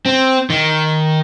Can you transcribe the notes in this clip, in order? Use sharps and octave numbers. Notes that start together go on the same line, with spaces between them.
C4
D#3